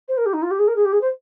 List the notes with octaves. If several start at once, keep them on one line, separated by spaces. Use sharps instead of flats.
C5
A#4
G4
D#4
F4
G4
G#4
A#4
G#4
G4
G#4
C5